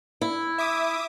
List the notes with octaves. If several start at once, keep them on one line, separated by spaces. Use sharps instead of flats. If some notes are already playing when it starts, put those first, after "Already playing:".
E4
E5 D6 D#6